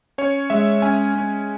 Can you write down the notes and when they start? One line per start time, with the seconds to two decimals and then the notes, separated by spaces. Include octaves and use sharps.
0.18 C#4 C#5
0.50 G#3 E5
0.82 C#4 G#5
1.15 C#4